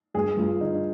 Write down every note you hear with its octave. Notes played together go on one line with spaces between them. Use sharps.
G2 G#4
G2 F4
D3 D#4